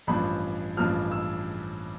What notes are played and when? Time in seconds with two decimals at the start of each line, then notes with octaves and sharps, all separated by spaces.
0.07 A1 G2 F3 B5
0.77 A1 G2 F3 F6
1.12 E6